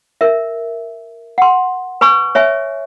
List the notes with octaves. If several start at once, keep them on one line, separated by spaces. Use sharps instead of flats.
A#4 E5
F#5 C6
B4 G#5 C#6
C#5 E5 G#5